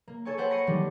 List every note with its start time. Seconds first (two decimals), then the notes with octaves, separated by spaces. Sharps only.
0.07 A#3
0.25 A4 C#5 G#5 C#6
0.37 A4 B4 C5 F#5 G5
0.50 B5 C#6 A#6 C7 C#7 D#7
0.67 D#3 E3 F#3 G3 A3 A#3